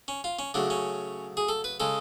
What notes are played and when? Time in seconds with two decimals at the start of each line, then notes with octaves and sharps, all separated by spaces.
0.08 C#4
0.24 F4
0.39 C#4
0.54 C#3 F#3 A3 D4
0.70 C#4
1.37 G#4
1.49 A4
1.64 B4
1.80 C#3 G#3 A4